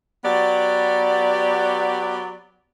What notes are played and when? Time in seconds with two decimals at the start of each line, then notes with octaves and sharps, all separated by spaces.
0.24 F#3 B3 G4 D5